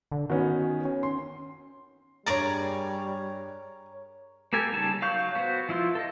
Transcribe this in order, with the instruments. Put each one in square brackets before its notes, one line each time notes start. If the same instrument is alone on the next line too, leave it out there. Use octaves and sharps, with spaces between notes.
[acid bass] D3
[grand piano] D#3 B3 C#4 [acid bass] F#4
[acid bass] C#4
[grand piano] C6
[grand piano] G2 A6 [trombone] G3 [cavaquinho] G#4 D5 A#5 [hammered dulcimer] A#4 C#5
[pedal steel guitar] A#3 G4 A4 G#5
C#3 G3 D#4 A5
F#3 F5 C#6 G6
B3 F#4 C5
F3 E4 F4 C6
A4 D#5